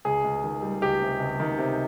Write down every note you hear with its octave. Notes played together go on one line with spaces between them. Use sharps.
C#2 G#4
C#2
D#3
G3
C#2 G4
C3
C#2
D#3
C3